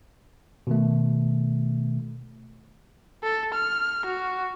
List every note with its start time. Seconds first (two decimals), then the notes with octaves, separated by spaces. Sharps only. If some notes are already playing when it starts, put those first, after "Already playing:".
0.67 B2 D#3 A3
3.23 A4
3.54 F6
4.06 F#4